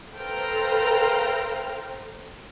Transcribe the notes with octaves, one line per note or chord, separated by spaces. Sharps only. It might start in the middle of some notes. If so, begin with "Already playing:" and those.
A4 B4 C5 F5 G5 A#5